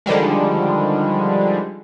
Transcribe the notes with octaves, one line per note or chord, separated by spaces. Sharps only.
D3 D#3 F3 G3 G#3